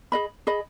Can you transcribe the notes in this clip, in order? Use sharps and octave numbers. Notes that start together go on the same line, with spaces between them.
G#4 D#5 B5
G#4 D#5 B5